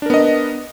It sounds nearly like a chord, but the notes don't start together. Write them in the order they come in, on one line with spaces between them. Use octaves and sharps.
D4 A#4 B3 D#5